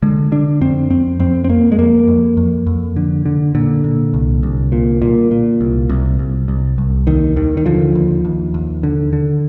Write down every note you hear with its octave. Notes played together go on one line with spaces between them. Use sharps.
D3 G#3
D3 D4
F2 C4
F2 C4
F2 C4
C4
F2 A#3
G#3
F2 A#3
F2
F2
F2
D3
D3
A#2 D3
A#2
C2
C2
A#2
A#2
A#2
C2
C2
C2
C2
C2
D#2 D#3
D#2 D#3
D#3
D3 F3
D#2
D#2
D#2
D3
D3